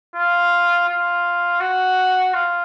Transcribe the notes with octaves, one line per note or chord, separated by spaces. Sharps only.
F4
F4
F#4
F4